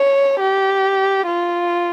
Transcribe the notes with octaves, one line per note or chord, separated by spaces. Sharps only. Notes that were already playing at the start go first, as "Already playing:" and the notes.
Already playing: C#5
G4
F4